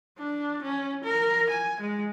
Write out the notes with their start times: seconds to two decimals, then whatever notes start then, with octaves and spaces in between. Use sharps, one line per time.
0.18 D4
0.63 C#4
1.05 A#4
1.50 G#5
1.81 G#3